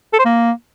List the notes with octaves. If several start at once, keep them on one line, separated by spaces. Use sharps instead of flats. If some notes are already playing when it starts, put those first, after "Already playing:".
A4
C5
A#3